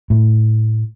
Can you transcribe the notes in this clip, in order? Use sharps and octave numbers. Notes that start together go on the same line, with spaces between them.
A2